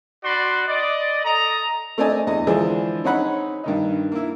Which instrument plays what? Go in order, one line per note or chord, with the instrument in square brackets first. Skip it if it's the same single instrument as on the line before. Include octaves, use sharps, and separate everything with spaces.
[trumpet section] D4 F#4 D5 B5 C6
D5 D#5
A4 D#5 A#5
[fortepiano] A3 C4 D4 D5 D#5 G#5
E2 D#5
D3 E3 F3 G#3 D4 G#4
C4 C#4 D#4 C#5 F#5 B5
G2 D#3 D#4
A#3 E4